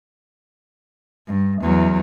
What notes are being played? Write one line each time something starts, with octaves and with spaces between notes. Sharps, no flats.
G2
E2 F#3